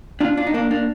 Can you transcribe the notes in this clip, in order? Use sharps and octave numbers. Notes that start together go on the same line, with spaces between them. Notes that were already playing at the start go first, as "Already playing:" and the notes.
D4 F4
D4 F4
D#4
A#3 D4
A#3 D4